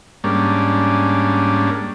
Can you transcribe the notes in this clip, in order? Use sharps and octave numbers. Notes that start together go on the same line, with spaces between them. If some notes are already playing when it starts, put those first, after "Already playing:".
G#2 G3 A#3 C#4 D4